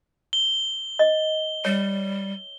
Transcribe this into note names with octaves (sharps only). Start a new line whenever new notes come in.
G7
D#5
G3 C#5